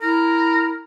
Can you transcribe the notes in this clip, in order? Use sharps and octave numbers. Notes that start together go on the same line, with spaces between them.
E4 A#4